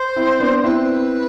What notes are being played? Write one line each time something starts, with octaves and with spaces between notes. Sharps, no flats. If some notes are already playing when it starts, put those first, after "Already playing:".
Already playing: C5
C4 E4
B3 D4
C4 E4 B4